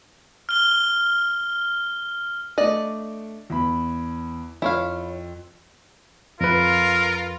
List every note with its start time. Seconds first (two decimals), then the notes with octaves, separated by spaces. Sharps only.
0.49 F6 G7
2.58 A3 D4 D5 D#5
3.50 E2 B5
4.62 F2 E4 C#5 F5
6.41 F2 F4 A#4 B4